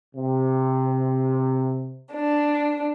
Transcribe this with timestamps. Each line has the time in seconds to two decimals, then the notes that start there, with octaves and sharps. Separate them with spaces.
0.16 C3
2.13 D4